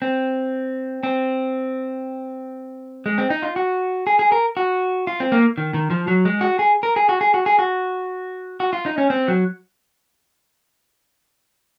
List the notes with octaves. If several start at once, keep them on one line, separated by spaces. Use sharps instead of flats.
C4
C4
G#3
C4
D#4
F4
F#4
G#4
G#4
A#4
F#4
F4
C4
A#3
D#3
D#3
F3
F#3
G#3
F#4
G#4
A#4
G#4
F#4
G#4
F#4
G#4
F#4
F#4
F4
D#4
C#4
C4
F#3